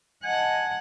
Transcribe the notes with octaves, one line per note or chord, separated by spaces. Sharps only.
D#5 F#5 G#5 A5